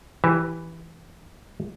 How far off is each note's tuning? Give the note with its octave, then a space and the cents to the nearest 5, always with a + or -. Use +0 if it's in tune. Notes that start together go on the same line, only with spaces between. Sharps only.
E3 +0 G4 +0 E5 +0